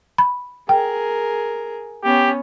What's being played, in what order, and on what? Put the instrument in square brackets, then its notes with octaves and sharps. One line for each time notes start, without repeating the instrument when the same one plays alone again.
[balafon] B5
[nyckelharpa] G#4 A#4 [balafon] G5
[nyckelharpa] B3 C#4 [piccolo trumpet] G4